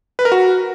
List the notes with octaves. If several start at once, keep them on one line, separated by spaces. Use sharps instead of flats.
B4
A#4
F#4